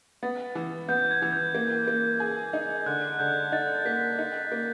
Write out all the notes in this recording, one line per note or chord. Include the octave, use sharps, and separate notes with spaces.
B3 A6
E3
B3 G6
G#6
E3
G6
A#3
A#3
G#4
D#4
D3 F#6
D3 G6
D#4 A6
A#3 B6
D#4
A#3